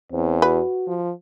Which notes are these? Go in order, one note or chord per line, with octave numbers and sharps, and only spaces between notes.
E2 C4
F#4 B4
F3